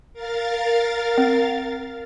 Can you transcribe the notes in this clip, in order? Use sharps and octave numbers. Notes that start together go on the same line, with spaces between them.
A#4 F5 A6
C4